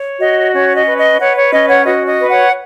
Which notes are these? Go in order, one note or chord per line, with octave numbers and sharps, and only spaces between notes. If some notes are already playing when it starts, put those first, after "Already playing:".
Already playing: C#5
F#4 D#5
C#4 C#5
D#5
B4
D#5
B4 C#5 F#5
C#5
C#4 D#5
C#5 F#5
F#4 D#5
D#5
B4
C#5 F#5